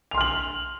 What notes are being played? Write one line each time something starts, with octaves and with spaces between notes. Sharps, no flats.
C6 F6 F7 F#7